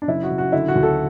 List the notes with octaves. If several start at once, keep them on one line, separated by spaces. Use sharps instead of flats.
D4
F#1 E4
F#4
F#1
F#4
D3 E4
F#4
D2
A4